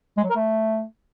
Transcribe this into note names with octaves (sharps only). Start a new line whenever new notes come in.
G#3
F#3
A#4
A3